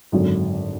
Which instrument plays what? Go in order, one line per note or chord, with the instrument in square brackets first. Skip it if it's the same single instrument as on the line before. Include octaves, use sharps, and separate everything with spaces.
[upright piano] G#1 F#2 D3 F#3